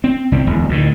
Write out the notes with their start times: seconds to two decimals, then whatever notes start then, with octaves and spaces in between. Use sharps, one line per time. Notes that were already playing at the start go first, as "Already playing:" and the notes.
0.04 C4
0.32 C2 C4
0.47 D1 G#1 E2
0.69 D2 A2 D#3